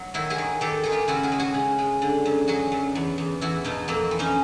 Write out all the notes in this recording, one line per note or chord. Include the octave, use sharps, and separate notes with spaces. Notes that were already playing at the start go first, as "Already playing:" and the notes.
Already playing: F#3
D#3 E4 F#4
F#4 G#4
D#3
D#3 G4 A4
D#3 G#4
F4 G4
C#3 E4 F#4
F#4 G#4
G#3
F#4 G#4
C#3
G#3
D3
F#2
F#3 F#4 G#4
F#2
E2
E2
E2 E4 F#4
B2 D#4 F4
F2 A#3 C4
E3
C#4 D#4